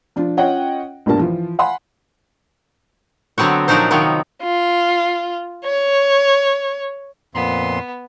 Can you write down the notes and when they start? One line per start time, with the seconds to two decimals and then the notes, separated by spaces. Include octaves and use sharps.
0.16 F3 D4 F4
0.37 C#4 F4 C#5 D#5 F#5 G5
1.06 A#1 G2 B2 D4 A#4 A5
1.19 E3 F3 F4
1.59 F5 F#5 G#5 B5 C6
3.38 D3 F#3 B3 C4 F#4
3.68 A#2 F3 F#3 D4 D#4 C5
3.91 C3 D#3 F3 F#3 B3
4.43 F4
5.65 C#5
7.35 F2 A#2 B3 C6